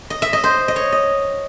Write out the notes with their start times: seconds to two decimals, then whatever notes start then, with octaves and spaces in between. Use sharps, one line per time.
0.10 D#5
0.22 E5
0.33 D#5
0.44 C5
0.68 D#5
0.76 C#5
0.92 D#5